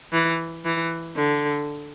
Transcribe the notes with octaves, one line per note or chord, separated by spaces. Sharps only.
E3
E3
D3